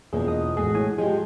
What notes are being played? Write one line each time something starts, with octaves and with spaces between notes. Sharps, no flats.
E1 F3 A#3 B3 G#4
D#5 D#6
A1 G#3 F#4 G#4 A4
A2 G#5
F3 G#3 G4